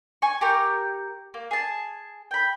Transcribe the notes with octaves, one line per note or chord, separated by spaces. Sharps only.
G#5 C#6
G4 A#4 A#5 C#6
A#3
G#4 A5
G5 B5